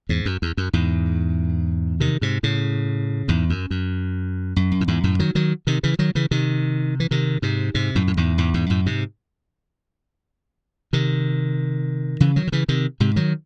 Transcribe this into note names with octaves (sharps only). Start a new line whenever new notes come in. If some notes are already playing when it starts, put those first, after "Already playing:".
E2 G#2
F#2
E2
F#2
E2 G#2
C3 D#3
G#2 C3
A2 C#3
E2 G#2
F#2
F#2
F#2
F#2
A2
E2 G#2
F#2 A2
D#3 F#3
D#3 F#3
C3 D#3
C#3 E3
D#3 F#3
C#3 E3
C3 D#3
E3
C3 D#3
G#2 C3
G#2 C3
F#2 A2
A2
E2 G#2
E2 G#2
E2 G#2
F#2 A2
G#2 C3
C3 D#3
C#3 E3
D#3 F#3
D#3
C#3 E3
C3 D#3
G#2 C3
D#3 F#3